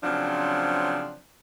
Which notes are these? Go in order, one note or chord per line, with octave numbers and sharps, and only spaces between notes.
C#3 F3 F#3 C4 D4